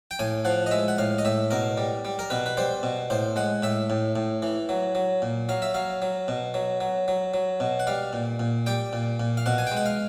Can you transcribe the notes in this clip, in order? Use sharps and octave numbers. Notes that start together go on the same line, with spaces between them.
G5
A2 G#5
F3 F#5
D#5
G#3 E5
F#5
A2 F5
D#5
A2 E5
B2 A#4
G3
G3
A#4
B2 B4
B4
G3 C5
B2
A2 C5
G#3 F#5
A2 E5
A2
A2
E3
F#3
F#3
A#2
F#3 F5
E5
F#3 F5
F#3
B2
F#3
F#3
F#3
F#3
B2
F#5
G3 F5
A#2
A#2
G3 G5
A#2
A#2
F5
B2 F#5
G#5
G5
G#3
F#5
F5